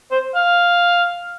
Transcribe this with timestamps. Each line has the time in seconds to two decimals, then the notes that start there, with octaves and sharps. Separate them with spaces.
0.11 C5
0.35 F5